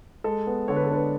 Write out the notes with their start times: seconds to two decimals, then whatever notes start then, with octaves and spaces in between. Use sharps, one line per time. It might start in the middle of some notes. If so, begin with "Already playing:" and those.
0.24 G#3 A4
0.47 B3
0.68 D3 C#5
0.76 B4
0.85 A4
0.91 D4 B4